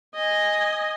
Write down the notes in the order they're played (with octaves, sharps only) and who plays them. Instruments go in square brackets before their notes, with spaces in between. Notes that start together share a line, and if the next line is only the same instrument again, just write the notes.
[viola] D#5 G#5